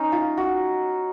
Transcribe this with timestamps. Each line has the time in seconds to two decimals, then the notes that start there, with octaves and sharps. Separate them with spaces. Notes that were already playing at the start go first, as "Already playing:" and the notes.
Already playing: C#4 D#4
0.12 F4
0.37 F#4